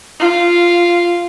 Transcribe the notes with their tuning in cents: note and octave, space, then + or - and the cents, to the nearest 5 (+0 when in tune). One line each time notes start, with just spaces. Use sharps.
F4 -5